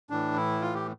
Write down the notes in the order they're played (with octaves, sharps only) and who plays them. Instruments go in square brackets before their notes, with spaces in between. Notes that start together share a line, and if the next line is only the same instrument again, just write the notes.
[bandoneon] A2 E3 D4
E4
F4
G4